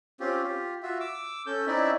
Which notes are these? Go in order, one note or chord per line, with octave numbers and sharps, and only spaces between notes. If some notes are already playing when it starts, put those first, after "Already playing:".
C4 C#4 F4 G4
F4 G4
F4 F#4 E5
D6 E6
C#4 A4 G6
C4 C#4 D#4 E4 D5 E5